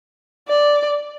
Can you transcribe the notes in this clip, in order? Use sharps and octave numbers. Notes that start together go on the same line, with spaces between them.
D5